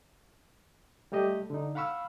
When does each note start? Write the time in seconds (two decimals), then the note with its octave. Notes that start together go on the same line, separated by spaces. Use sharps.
1.12 G3 A3 G4 D#5
1.50 D3 D#4
1.75 F5 F#5 B5 C#6 E6 F6